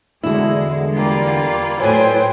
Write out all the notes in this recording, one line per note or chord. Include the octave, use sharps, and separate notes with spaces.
E2 D3 G#3 E4 F#4
G3 A#3 F4
A2 F#3 B4 C5 G5 G#5 C6